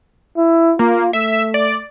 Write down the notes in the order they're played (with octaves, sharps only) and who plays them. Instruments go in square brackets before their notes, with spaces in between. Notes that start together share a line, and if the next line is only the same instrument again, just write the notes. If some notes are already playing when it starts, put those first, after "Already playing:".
[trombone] E4
[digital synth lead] A#3 [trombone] F4
[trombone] A3 [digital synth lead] E5
[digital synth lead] D5